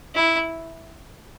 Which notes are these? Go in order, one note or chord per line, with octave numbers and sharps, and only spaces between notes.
E4